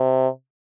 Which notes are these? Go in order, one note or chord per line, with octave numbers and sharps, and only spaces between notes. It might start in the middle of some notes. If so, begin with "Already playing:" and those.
Already playing: C3